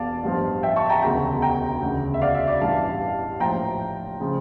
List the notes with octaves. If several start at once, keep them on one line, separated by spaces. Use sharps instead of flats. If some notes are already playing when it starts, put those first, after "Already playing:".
Already playing: E1 E2 D5 F5 A5
A1 G2 F3
E5 G5
A5 C#6
G5 A#5
E1 D2 C#3 G5 A#5
G5 A#5
E1 D2 C#3
E5
D5 F5
E5
D5
A1 G2 E3 G3 F5 A5
A#1 A2 F3 G5 A#5
C#3 F3